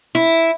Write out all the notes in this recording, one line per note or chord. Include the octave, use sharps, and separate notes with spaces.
E4